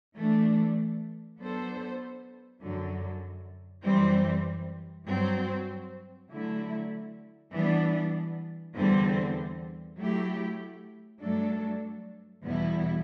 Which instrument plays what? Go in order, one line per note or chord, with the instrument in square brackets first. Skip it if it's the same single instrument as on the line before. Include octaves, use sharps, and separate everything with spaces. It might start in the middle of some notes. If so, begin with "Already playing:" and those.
[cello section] E3 A3 D4
F#3 B3 D4 A4 C5
F#2 D3 F#3
F#2 E3 G3 C4
G2 F#3 C4 F#4
D3 F#3 A3 E4
E3 G3 B3 D4
E2 D3 G3 C4
F#3 A3 E4 G4
G2 F#3 A3 D4 A4
E2 B2 G3 B3 E4